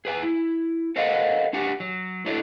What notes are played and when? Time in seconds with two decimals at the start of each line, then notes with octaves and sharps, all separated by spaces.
0.05 G#4 B4 G5 G#5
0.23 E4
0.96 A4 A#4 C5 D#5 F5 F#5
1.53 D4 F#4 G4 F#5 G#5
1.80 F#3
2.26 D4 E4 F#4 A4 C#5 D5